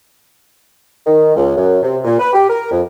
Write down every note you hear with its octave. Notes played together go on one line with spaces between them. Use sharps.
D#3
C#2
F#2
C3
A#2
B4
G4
A#4
F2